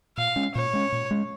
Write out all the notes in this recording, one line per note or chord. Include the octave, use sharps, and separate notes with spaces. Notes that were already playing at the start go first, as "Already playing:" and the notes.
A#2 F5
G#3 C#4
A#2 C#5
G#3 C#4
A#2
G#3 C#4